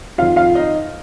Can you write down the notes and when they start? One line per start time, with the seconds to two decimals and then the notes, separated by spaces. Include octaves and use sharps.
0.18 F2 D#3 F4 F5
0.36 F4 F5
0.55 D#4 D#5